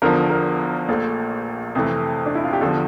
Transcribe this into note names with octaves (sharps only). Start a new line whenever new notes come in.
E2 D3 F3 A#4
A#4
A#1 A#2 A3
F2 C3 E3 A3
D4
E4
F4
G4
E2 D3 F3 A4